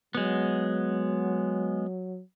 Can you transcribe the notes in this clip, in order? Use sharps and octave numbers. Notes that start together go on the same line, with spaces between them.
F#3 G#3 B3